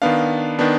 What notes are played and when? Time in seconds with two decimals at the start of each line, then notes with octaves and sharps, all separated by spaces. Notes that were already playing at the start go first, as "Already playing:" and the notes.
0.02 D#3 B3 D4 F5
0.59 D#3 B3 D4